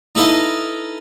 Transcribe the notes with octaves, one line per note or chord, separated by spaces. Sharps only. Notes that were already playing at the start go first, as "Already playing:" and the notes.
D#4 E4 A4 B4 D#5 F5